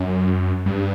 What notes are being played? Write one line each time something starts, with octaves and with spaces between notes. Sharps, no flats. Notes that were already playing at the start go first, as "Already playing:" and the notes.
Already playing: F#2
G2